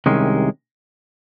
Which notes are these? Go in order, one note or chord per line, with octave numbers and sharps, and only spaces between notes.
C2 C3 D#3 G#3 C#4